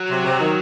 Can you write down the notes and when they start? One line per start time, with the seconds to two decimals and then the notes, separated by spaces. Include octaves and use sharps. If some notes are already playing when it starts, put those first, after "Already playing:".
Already playing: F#3
0.09 C3
0.25 C3
0.40 D#3